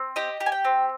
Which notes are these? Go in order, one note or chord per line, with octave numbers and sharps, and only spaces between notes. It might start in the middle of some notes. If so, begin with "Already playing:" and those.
Already playing: C4
G4 D#5
G4
G#5
G5
C4